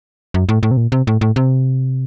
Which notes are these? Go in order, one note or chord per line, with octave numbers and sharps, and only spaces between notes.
F#2
A2
A2
C3
A#2
C3
A2
A2
C3